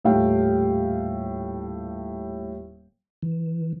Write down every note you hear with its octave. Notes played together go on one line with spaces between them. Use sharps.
D#1 A2 G4 F5 G5
E3